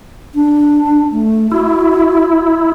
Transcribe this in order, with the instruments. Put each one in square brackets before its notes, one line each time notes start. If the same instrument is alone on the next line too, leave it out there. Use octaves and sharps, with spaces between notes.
[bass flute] D4
A3
[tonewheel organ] E4 [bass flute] F#4